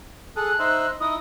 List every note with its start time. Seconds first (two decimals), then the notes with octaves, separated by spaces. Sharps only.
0.36 G#4 A4 F#6
0.59 D#4 C5 E5
1.00 D#4 E4 D#6